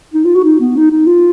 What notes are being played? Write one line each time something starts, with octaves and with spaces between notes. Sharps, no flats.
D#4
F4
F#4
D#4
B3
D#4
D#4
F4